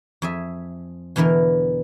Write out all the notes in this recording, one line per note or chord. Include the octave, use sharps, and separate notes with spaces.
F2 G#4 E5
E2 B2 D3 E3 A#4